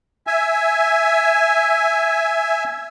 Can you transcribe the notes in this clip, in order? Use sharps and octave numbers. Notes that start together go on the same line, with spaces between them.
E5 G#5